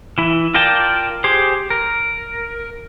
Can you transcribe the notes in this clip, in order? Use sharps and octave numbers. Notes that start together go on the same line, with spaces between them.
E3 E4
F4 A#4 D5 G5 A5
G4 G#4 C5
A#4